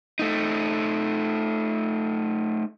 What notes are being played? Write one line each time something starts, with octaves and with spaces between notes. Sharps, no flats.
A3 D#4